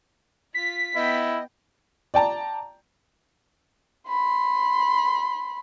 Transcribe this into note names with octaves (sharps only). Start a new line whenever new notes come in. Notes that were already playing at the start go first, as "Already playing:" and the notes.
F4 B6
B3 E4 D#5 G5
D5 G5 A5 A#5
B5 C6